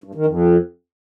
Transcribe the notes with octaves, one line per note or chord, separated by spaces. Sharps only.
G2
D#3
F2